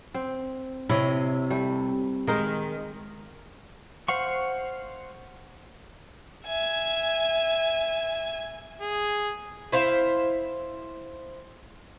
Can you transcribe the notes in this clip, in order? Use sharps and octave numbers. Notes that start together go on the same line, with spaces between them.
C4
C3 E4 C#5 D#5
G3 A3
D#3 G#3 A#4 G5
C5 F5 F#5 C#6
E5 G#5
G#4
E4 C5 F5